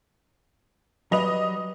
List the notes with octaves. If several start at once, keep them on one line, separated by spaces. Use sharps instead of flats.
F#3 G3 B4 D#5 F7